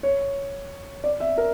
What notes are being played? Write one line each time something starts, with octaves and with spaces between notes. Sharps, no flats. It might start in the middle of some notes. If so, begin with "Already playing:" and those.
C#5
D5
E5
A#4